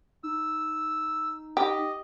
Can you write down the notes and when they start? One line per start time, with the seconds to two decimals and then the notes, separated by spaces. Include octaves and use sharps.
0.23 D#4 E6
1.57 G4 D#5